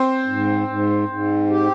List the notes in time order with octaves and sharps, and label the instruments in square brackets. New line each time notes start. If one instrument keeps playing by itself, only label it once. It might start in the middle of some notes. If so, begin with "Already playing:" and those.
Already playing: [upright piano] C4 C5
[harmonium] G#2
G#2
G#2
G4